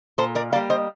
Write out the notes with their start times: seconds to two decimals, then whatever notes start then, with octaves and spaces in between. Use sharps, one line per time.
0.18 A#2 A4 C5
0.35 A#4 D5
0.52 A#3 D5 F5
0.56 G3
0.70 C5 D#5